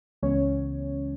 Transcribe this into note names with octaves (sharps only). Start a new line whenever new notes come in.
C#2 C#3 E3 G#3 B3 C#4 C#5